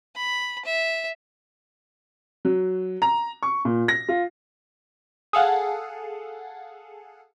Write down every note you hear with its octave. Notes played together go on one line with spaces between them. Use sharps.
B5
E5
F#3
A#5
C#6
A#2
A#6
F4
G#4 A4 F5 F#5